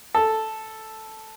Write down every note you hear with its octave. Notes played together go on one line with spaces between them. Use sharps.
A4